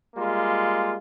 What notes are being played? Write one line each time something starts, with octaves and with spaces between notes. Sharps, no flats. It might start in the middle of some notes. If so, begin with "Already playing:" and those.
G3 G#3 A#3 F4